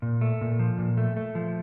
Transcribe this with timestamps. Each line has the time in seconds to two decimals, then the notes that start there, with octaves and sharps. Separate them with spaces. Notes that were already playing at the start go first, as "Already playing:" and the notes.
0.02 A#2
0.21 A3
0.41 A#2
0.59 F3
0.79 A#2
0.97 A3
1.17 A3
1.35 F3